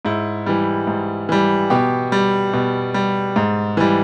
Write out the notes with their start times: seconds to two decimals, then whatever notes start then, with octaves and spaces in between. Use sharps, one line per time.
0.05 G#2 E4
0.46 E3 G3
0.87 G#2
1.29 E3 G3
1.70 B2 G4
2.12 G3
2.53 B2
2.94 G3
3.36 G#2
3.77 E3 G3